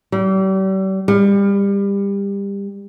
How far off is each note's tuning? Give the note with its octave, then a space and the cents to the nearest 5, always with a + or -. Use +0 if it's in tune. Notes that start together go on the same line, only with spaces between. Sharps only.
G3 -40
G3 +25